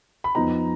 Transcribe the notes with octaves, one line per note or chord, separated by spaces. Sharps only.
B5
F2 F3 B3 D#4 A#5